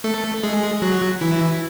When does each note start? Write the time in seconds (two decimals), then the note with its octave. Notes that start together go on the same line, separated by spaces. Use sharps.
0.04 A3 A4
0.43 G#3 G#4
0.82 F#3 F#4
1.21 E3 E4